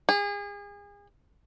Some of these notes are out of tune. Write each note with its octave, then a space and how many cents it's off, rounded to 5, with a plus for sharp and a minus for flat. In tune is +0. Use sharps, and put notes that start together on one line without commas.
G#4 -35